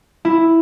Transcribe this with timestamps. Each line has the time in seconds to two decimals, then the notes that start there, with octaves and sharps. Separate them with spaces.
0.25 E4